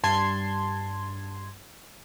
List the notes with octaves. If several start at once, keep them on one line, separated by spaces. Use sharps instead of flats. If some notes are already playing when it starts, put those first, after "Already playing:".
G2 A5 C6 G#6